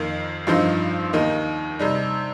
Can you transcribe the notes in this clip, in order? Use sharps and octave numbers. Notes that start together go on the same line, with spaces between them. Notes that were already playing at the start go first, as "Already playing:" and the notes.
Already playing: F2 D#3 A#3
G2 F3 C4 D#4
D#2 D#3 A#3 D#4
C3 G3 D#4